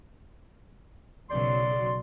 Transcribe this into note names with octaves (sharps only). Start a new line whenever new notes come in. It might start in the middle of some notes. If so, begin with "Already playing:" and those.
B1 C#3 F#3 D5 C6